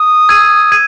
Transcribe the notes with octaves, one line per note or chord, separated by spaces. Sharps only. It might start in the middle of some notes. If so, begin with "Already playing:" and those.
Already playing: D#6
E6 G#6 D#7
G#6 D#7